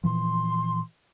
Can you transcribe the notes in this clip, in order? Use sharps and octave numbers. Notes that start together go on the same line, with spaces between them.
A#2 E3 F3 C6